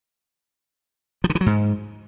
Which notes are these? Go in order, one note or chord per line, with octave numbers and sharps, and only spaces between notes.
F3
D3
E3
F#3
G#2